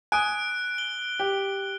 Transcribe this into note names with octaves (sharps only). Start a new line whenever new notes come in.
G#5 D#6 F#6 D7
G7
G4